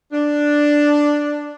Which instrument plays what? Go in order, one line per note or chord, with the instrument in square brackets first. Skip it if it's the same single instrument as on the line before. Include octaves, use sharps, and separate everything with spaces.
[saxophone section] D4